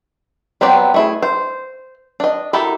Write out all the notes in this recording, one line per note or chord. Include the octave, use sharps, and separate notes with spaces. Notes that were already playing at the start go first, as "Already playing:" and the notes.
F#3 B3 C4 G4 D5
A3 E4 G#4
C5
D4 D#5
E4 F#4 G4 A4 A#4